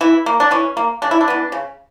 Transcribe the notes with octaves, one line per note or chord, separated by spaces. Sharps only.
E3 E4
A#3
D4
E3 C#4
A#3
C#3 D4
E4
D4
E3 B3
C#3